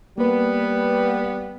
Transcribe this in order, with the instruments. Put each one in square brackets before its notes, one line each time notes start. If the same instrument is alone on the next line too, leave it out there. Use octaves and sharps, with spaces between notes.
[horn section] G3 B3 [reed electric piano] A#3 B4